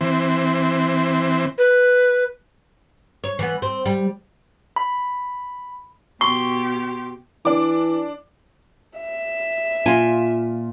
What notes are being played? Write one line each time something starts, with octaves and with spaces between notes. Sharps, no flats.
E3 C4
B4
C#5
E3 B3
C4
G3
B5
B2 G4 C6 C#6
E3 D4 D6
E5
A#2 F4 G#5